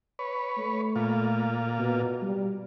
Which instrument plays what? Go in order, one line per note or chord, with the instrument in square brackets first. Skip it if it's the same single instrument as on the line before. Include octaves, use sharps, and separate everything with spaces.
[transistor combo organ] B4 C#5
[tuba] A3
[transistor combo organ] A#2 F4
[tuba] B2
G3